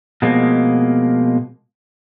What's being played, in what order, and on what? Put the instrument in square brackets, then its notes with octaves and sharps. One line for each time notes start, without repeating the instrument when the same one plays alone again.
[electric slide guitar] B2 F3 G#3 A#3 C4